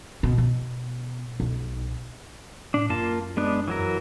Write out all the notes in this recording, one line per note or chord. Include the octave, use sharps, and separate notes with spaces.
B2
B2
B1
A2 D4
F#2 A#3 F4 A5
G#3 B3 D4
E3 F#3 A#4